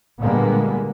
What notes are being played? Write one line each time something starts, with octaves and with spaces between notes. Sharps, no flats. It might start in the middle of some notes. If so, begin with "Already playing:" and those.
A#2 D3 G3 G#3 A#3 B3